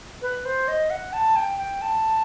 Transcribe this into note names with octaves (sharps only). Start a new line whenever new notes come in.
B4
C5
D#5
F#5
A5
G5
G5
A5